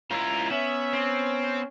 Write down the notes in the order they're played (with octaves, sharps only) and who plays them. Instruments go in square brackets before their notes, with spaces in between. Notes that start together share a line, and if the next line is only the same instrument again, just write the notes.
[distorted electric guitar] C#2 E4 [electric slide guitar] F4 [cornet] A#5
[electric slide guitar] B3 [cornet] C#4 [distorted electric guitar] E5
[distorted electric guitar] C4